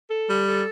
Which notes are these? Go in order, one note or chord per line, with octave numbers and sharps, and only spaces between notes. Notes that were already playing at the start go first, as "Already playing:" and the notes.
A4
G3
A4